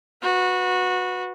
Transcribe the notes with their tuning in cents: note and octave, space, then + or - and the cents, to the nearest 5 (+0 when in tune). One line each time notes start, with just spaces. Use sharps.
F#4 -20 B4 +0